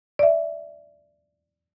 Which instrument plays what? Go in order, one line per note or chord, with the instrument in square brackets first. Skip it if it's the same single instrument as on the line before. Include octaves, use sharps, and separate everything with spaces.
[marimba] D5 E5